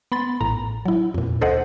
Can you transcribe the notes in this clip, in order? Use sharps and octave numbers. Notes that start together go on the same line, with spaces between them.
B3 B5 C6 A6
A1 A2 A#5
F#3 E4
F2 A#2
D2 A4 C5 D#5 F#5